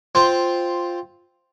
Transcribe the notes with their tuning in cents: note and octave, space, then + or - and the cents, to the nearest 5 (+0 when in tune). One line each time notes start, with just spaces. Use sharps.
C4 +0 F4 +0 C5 +0